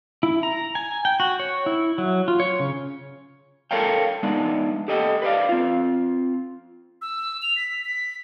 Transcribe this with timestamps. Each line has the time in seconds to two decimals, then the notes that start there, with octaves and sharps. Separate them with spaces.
0.23 E4
0.43 A#5
0.75 G#5
1.05 G5
1.20 F#4
1.40 C#5
1.66 E4
1.98 F#3
2.28 F4
2.40 C#5
2.60 C#3
3.71 A4 A#4 C#5 F5 G5
4.23 G#3 B3 D4 D#4
4.88 G4 A4 D#5 G5
5.22 B4 C5 D5 F5
5.49 C4 F4
7.02 E6
7.42 F7
7.56 B6
7.85 B6